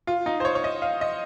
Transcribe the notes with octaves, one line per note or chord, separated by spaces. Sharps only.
F4
D#4
C5
C#5
C#5
D#5
F5
D#5